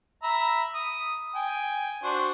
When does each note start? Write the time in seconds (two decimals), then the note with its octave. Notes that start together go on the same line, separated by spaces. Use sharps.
0.23 E5 A#5 B5
0.75 D#6
1.35 G5 G#5
2.03 D4 F#4 C5